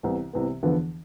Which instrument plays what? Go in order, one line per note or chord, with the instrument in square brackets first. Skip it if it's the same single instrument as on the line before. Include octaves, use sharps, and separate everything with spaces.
[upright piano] C2 C3 E3 B3
C2 C3 E3 B3
E2 D3 F3 B3